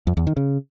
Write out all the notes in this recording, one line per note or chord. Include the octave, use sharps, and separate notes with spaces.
F2
E2
D#3
C#3